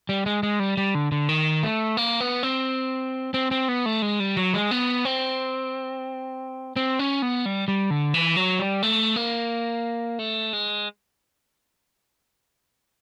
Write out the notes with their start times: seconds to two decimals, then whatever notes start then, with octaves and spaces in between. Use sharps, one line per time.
0.09 G3
0.26 G#3
0.43 G#3
0.60 G3
0.77 G3
0.95 D3
1.12 D3
1.29 D#3
1.63 A3
1.97 A#3
2.21 B3
2.43 C4
3.34 C4
3.51 C4
3.68 B3
3.86 A3
4.02 G#3
4.20 G3
4.37 F#3
4.54 G#3
4.71 B3
5.05 C4
6.76 C4
6.99 C#4
7.22 B3
7.46 G3
7.68 G3
7.90 D3
8.14 E3
8.36 F#3
8.59 G3
8.83 A3
9.16 A#3
10.19 A3
10.53 G#3